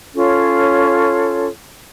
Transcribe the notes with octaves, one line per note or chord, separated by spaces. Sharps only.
C#4 F4 A4 C#5